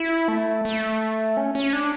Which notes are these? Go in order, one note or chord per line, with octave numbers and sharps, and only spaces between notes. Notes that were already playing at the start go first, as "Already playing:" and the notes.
Already playing: E4
A3
A3
C#4
C#4
D4